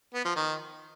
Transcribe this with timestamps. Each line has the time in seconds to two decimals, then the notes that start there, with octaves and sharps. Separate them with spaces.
0.14 B3
0.25 F3
0.36 D#3